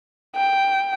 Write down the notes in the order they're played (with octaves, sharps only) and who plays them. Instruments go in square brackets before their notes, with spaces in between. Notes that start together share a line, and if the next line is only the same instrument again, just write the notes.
[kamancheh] G5